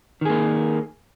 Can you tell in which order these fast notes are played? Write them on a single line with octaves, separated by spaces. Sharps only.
D#3 G#4 A#3